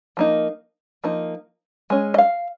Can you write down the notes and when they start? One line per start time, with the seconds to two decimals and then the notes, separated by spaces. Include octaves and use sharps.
0.17 F3 A#3 D#4
1.04 F3 A#3 D#4
1.90 G#3 C#4
2.14 D#5
2.18 F5